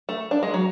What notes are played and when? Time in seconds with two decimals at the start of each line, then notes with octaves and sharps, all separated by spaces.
0.09 A3
0.31 D4
0.43 G#3
0.54 F#3